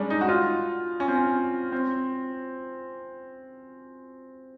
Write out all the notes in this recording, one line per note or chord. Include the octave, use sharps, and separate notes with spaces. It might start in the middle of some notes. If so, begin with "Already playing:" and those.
Already playing: G3 G#3 C#4 D4
D#4
F#4
F4
C#4
C4
C#4
C4